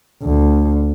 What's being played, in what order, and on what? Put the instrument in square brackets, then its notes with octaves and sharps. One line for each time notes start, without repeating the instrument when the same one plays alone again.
[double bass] D2